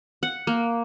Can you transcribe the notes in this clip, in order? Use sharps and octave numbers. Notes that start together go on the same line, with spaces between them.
F#5
A#3